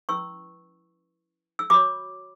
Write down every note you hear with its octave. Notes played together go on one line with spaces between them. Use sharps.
C#4 E4 B4 C#6 E6
E6
F#4 C#5 B5 D6